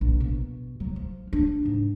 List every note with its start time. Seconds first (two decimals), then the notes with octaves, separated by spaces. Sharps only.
0.01 A#1
0.20 B2
0.80 F#3
0.96 F3
1.33 D4
1.65 G#2